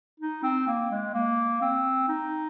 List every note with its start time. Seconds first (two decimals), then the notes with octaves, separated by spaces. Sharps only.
0.20 D#4
0.43 C4
0.67 A#3
0.91 G#3
1.14 A#3
1.62 C4
2.08 D#4